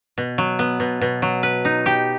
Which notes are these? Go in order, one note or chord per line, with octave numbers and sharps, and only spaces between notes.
B2
F#3
B3
B2
B2
F#3
B4
D#4
G4